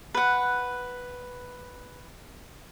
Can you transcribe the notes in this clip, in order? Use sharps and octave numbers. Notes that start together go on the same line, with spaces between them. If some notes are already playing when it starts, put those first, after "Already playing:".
B4 F#5